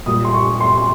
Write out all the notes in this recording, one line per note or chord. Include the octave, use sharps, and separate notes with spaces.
A#2 G3 D#6
C6
C#6
C6
C6